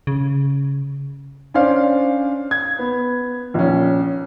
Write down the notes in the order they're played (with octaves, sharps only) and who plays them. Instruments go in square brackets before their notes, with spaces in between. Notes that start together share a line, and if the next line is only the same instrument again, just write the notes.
[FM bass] C#3
[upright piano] C#4 D4 C5 D5 F5
G#6
B3
A#1 C#4